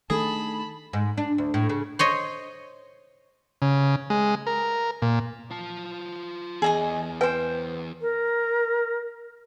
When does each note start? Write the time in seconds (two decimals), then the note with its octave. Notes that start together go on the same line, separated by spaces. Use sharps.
0.10 D#3 A3 D4 G#4 A4 A5 B5
0.93 G#2
1.18 D4
1.38 D2
1.54 A2
1.69 C#3
1.99 C5 C#5 D#5
3.62 C#3
4.10 G#3
4.47 A#4
5.02 A#2
5.51 F4 A5
6.62 E2 G#4 D#5 G#5
7.21 B4 C5 G5 G#5
8.01 A#4